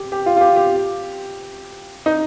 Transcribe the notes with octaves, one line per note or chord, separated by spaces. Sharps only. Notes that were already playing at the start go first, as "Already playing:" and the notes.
Already playing: G4
G4
F4
F4
G4
G4
D#4